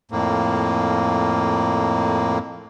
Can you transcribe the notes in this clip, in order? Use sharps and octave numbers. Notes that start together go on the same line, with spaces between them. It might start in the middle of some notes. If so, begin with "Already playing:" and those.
F2 A2 A#3